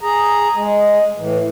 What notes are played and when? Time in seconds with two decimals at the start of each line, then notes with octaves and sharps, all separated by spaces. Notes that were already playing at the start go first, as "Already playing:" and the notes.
0.01 G#4 A#5
0.55 G#3
1.17 A2 E3